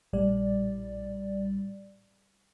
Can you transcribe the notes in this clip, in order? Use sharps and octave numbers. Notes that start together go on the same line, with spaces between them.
A#1 A2 G3 D5